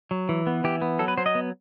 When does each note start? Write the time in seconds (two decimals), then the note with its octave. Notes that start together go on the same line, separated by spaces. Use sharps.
0.11 F#3
0.29 E3
0.47 B3
0.64 E3 G4
0.82 B3
0.99 F#3 A4
1.08 B4
1.18 F#3 C5
1.26 D#5
1.35 B3